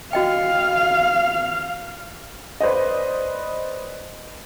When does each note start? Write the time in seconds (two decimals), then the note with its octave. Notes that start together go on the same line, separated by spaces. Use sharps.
0.13 F#4 D#5 F5 G5
2.60 B4 C5 D5 D#5